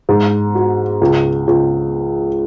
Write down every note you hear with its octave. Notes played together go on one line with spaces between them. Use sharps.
G#2
F#4
C#2
C#2